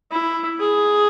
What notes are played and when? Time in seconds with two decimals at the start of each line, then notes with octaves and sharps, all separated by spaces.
0.11 E4
0.60 G#4